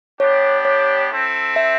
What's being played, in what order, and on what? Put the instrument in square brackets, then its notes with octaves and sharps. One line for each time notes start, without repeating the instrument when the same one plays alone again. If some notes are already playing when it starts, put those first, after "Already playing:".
[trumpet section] B3 D4 G4 [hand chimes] C#5
[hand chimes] C#5
[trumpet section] C4 E4 A4
[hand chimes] E5